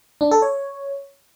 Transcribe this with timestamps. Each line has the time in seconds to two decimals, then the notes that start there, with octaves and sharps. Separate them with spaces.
0.21 D4
0.31 A4
0.42 C#5